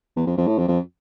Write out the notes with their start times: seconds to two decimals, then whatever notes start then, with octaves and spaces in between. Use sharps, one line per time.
0.16 E2
0.27 F2
0.37 F2
0.47 A2
0.58 F2
0.68 F2